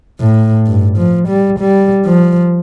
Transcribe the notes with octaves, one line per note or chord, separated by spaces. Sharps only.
A2
G2
F3
G3
G3
F3